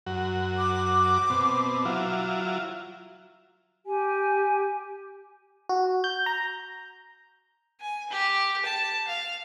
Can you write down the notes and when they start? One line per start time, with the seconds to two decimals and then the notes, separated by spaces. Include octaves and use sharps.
0.06 F#2 F#4
0.58 D6
1.30 B2 C4
1.85 F#3 E4 F4
3.86 G4 G#5
5.69 F#4
6.04 G6
6.26 A#5
7.80 G#5
8.10 G4
8.65 A5
9.08 F5